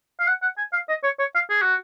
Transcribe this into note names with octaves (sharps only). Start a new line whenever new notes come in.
F5
F#5
F#5
G#5
F5
D#5
C#5
C#5
F5
G#4
F#4